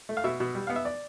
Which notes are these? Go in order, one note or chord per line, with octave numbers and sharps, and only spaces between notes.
A3
F5
B2 E5
B2
G3
B3 F5
E5
D5